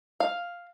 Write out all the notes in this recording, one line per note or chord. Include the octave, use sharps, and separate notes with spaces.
F5